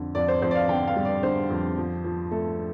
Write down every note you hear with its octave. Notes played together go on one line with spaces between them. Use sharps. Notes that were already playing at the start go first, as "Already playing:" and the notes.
Already playing: F2 D3
F2 D5
C5
F2 C5
D5
F5
D3 G5
F5
G3
D5
D3 C5
F2
F3
F3
A3 A4